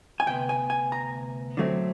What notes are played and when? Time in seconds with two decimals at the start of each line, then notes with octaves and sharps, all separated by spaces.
0.20 G#5
0.26 D2 C3 B3 G5
0.49 G#5
0.70 G#5
0.92 A#5
1.57 D3 F#3 A3 C4